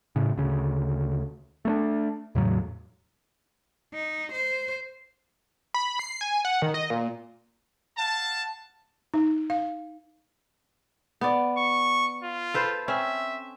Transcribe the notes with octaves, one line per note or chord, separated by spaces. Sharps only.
A2 C#3
D2 C#3
A3 A#3 D4
E2 A2 C#3 F#3
D#4
C5
B5
C7
G#5
F#5
D#3
D#5
A#2
F5 F#5 A5
D#4
F5
B3 D5
C#6
F4
A4 B4 C5
C4 C#4 E5